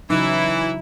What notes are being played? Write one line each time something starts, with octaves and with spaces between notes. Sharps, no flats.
C#3 E3 F#3 D#4 E4